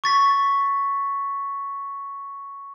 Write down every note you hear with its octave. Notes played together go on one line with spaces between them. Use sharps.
C#6 A6 B6